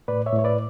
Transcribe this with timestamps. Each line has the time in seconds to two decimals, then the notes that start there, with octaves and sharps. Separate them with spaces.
0.08 A2 B4 D5
0.26 C#5 E5
0.32 A2
0.39 C#5
0.44 B4 D5